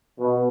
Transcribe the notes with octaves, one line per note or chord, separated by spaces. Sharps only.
B2